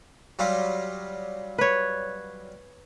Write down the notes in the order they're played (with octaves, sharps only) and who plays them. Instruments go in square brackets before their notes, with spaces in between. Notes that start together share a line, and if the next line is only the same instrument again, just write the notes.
[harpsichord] F#3 G3 F4
[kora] B4 C#5